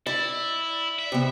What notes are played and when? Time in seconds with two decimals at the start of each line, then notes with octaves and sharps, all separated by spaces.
0.07 E4 D5
0.99 E5
1.12 C3 B3